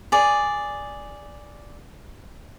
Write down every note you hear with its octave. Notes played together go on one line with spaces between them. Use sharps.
G#4 D5